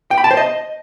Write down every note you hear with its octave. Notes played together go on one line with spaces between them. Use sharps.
G5
B5
A5
C5
D#5